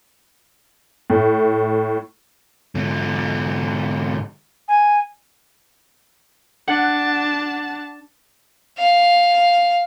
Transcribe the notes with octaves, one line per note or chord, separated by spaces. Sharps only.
A2
G#2 D3
G#5
D4 F#5 A5
F5